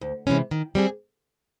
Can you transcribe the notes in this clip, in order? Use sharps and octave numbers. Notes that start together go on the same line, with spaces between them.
D2
C3 E3 G#3 C#4
D#3
G3 C4 F4 G#4